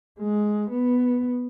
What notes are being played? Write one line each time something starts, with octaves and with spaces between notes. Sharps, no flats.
G#3
B3